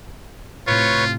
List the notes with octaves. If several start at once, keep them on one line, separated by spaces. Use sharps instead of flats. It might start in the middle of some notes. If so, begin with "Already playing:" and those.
A2 C3 F4 B4 C#5 C#6